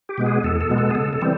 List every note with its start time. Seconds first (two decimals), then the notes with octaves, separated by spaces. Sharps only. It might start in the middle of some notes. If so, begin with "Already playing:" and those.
0.09 G4
0.18 B2 G#3 B3
0.26 G#4
0.43 E2 A4
0.61 A4
0.69 B2 G#3 B3
0.78 A4
0.90 G#4
0.95 C#3 A4
1.13 A4
1.22 E3 G3 C4